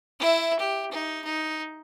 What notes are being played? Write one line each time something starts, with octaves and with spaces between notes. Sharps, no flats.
E4 E5
G4
D#4
D#4